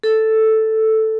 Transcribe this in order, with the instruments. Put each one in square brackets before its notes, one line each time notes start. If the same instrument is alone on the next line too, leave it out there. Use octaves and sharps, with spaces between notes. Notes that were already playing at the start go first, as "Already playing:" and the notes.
[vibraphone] A4